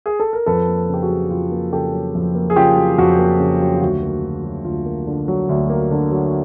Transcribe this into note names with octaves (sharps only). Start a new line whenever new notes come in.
G#4
A4
A#4
F2 A4 B4
A#3
C#3
G4
F#4 G#4
F#3
F2 F4 G4
A#3
C#3 G4 A4
F#3
F2
A#3
G#4
C#3 F4 G4
F#3
F2 F#4
A#3
C#3
F#3
G4
D2 F#4
A#3
D3
F#3
D2 F4
A#3
D3
F#3
D2
A#3
D3
F#3